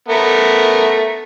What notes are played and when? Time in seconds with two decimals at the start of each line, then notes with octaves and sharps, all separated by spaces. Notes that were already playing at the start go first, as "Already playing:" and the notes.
0.08 A3 B3 A#4